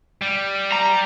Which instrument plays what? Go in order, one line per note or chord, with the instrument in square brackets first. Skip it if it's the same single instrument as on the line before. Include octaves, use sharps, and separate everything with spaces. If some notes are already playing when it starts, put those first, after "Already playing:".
[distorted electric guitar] G3
[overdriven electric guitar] A#5